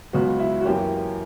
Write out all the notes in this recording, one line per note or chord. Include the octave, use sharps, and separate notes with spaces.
C#2 C#3 F#3 B3 F#4
E4
F#4
F#2 E3 A#3 C#4 G4